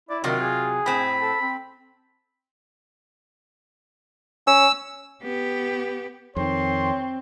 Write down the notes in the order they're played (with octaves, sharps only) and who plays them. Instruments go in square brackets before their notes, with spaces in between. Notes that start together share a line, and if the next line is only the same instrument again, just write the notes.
[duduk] E4 [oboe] D5
[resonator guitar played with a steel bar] C3 F#3 [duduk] D#3 [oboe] F4
[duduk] G#4
[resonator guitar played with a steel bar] A2 C4 [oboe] B5
[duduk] A4
C4
[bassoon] C#4 [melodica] E6
[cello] B3 G4
[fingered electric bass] F2 D#3 [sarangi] C4 [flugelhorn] C#5 [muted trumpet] C6